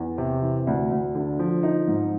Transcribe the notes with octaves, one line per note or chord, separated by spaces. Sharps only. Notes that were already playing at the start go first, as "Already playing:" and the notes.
Already playing: E2
C3
E3
D2
D2
D3
F3
D#4
G#2